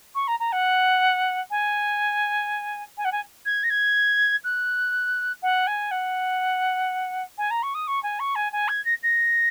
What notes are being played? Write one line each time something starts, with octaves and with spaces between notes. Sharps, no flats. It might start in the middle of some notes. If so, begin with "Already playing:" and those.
C#6
A#5
A#5
F#5
G#5
G#5
F#5
G#5
G#6
A#6
G#6
F#6
F#5
G#5
F#5
G#5
A#5
C#6
D#6
C#6
G#5
C#6
G#5
G#5
G#6
A#6
A#6